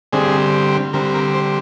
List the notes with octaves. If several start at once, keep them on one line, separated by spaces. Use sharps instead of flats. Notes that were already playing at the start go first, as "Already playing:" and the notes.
D3 G3 C4 G#4
D3 G3 C4 A#4
A#4
C5